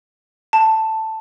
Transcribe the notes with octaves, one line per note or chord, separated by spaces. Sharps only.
A5